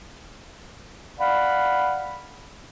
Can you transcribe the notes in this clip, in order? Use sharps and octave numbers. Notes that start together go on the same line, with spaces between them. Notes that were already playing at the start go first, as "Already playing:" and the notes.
D5 F5 F#5 B5